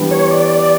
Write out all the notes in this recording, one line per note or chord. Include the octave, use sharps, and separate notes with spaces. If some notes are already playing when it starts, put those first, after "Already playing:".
Already playing: E3 G3 B3 D4
C#5
D5